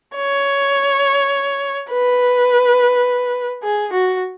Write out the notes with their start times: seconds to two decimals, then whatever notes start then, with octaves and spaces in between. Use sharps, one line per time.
0.16 C#5
1.90 B4
3.63 G#4
3.93 F#4